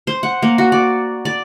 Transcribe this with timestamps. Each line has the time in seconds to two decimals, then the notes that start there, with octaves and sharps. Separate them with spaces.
0.07 C5
0.23 F#5
0.42 A#3
0.58 F#4
0.72 D5
1.25 D5